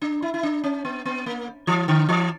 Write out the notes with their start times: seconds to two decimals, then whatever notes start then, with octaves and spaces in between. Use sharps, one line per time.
0.02 D4
0.22 E4
0.34 E4
0.43 D4
0.64 C#4
0.85 B3
1.05 B3
1.26 A#3
1.67 E3
1.88 D3
2.09 E3